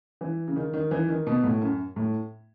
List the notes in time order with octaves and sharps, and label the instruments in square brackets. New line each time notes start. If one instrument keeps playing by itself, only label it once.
[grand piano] E3
C#3
D#3
D#3
E3
D#3
B2
A2
F#2
A2